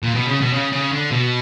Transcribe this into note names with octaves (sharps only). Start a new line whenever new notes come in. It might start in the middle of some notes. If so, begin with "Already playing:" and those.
A#2
B2
C#3
B2
C#3
C#3
D3
B2